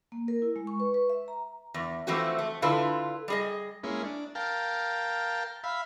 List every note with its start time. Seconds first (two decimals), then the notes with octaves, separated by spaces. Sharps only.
0.12 A#3
0.28 A#4
0.42 E4
0.56 G#3
0.67 C#6
0.80 B4
0.94 B4
1.09 E5
1.28 A#5
1.74 E2
2.07 E3 F3 A3 C4 F#4
2.39 A3
2.62 D3 E4 F4 A4 B4
3.28 G3 G#4 D#5
3.84 G#3 A#3 C#4 E4
4.04 D4
4.35 A#4 F5 G5 A5
5.64 E5 F5 B5